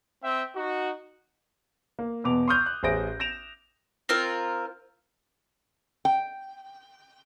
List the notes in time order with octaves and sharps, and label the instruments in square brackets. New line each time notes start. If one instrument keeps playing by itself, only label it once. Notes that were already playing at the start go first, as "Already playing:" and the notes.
[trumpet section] C4 E5 G5
D#4 F#4
[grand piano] A#3
E2 B2 D6 F7
C6 C#6 D#6 F6 G6
F#6
A1 G#4 C5 E5 A#6 D7
G6 A#6 D7 E7 F7
[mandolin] C4 F4 A#4
[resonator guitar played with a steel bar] G5